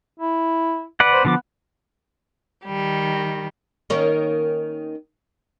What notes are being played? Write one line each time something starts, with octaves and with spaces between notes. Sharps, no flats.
E4
B4 D5 F#5
C5
D3 F3 B3 D6
D#3 G3
D#3 A#3 C#4